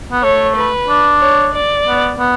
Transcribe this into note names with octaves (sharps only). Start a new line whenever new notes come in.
B3
A3 C#5
B4
D4
C#5
D5
B3
B3